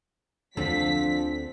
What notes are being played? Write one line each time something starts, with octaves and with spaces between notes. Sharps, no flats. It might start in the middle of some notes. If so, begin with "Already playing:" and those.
D2 F3 C4 D4 A4 B6